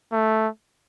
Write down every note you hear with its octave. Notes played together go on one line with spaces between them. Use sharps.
A3